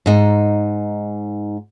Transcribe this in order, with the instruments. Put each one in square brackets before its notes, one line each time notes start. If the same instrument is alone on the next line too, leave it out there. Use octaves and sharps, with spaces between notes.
[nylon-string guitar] G#2 D#4